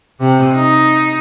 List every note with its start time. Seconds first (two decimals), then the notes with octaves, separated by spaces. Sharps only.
0.20 C3
0.55 D#4